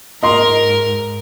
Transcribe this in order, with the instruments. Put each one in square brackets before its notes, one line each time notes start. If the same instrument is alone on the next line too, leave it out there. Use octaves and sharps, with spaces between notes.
[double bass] G#2 [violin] A#4 [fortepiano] D#5 C6